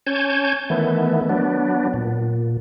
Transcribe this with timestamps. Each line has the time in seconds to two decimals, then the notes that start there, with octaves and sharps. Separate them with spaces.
0.07 C#4 C#5 G#5 A5 G6
0.70 D#3 E3 A3 B3
1.29 F#3 B3 D4
1.94 A#2